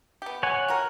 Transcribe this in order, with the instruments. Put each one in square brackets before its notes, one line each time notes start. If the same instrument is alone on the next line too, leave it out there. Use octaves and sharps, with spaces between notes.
[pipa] B3 G4
[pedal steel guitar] C#5 F#5 G#5
[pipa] A#3 F#4 A#4